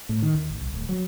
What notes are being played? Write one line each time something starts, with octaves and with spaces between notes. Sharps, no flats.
A2
D#3
D#2
A1
C2
D1
F#3